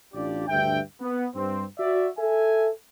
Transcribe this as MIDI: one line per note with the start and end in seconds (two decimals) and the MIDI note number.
0.13 0.43 33
0.13 0.43 62
0.13 0.43 65
0.13 0.43 67
0.13 0.43 74
0.48 0.80 38
0.48 0.80 43
0.48 0.80 76
0.48 0.80 79
1.01 1.27 59
1.35 1.64 43
1.35 1.64 60
1.79 2.09 66
1.79 2.09 74
1.79 2.09 76
2.18 2.68 69
2.18 2.68 76
2.18 2.68 80